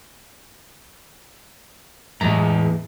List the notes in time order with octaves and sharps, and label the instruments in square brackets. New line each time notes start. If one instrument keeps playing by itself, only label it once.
[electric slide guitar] E2 A#5 [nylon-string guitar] A2 G#3